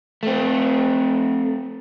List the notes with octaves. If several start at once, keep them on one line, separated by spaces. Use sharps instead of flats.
A3 C4